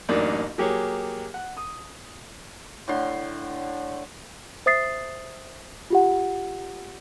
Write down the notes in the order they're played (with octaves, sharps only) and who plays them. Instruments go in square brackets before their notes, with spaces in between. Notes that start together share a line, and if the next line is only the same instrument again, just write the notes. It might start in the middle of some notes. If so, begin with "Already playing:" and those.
[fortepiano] A1 F#2 A#3 D4 D#4 D5
F#3 A#3 G4 G#4 C#5
F#5
D#6
[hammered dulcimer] A2 D3 C6
[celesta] C5 E5 D#6 A6 C7
F4 G4 F#5